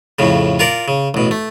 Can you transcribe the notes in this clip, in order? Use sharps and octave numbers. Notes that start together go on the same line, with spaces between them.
F2 A2 C#3
F4 A#4 D5
C#3
A1 B2
A3